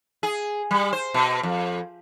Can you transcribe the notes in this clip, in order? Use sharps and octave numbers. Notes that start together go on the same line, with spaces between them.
G#4
G3
C5
B2
F2